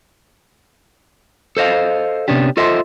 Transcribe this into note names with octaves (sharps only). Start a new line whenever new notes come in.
A4 C5 D#5 F5
C3 B3 C#4 D4 G4
F4 A4 C5 D#5 E5